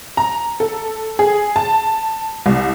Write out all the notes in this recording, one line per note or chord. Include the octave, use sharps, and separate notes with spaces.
A#5
A4
G#4
A5
C2